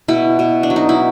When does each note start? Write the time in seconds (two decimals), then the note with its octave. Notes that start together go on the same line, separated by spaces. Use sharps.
0.08 B2 E4
0.39 B2
0.63 D4
0.70 F#3
0.76 D#4
0.89 E4